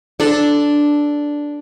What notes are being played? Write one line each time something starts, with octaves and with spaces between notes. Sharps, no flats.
D4 A4 D5